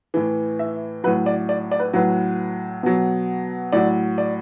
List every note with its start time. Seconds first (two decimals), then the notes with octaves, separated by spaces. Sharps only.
0.14 A2 E3
0.59 E5
1.04 F#3 B4
1.07 A2
1.26 D5
1.49 D5
1.71 D5
1.79 B4
1.93 A2 F#3 B4
2.83 B2 F#3
3.72 A2 F#3 D5
4.18 D5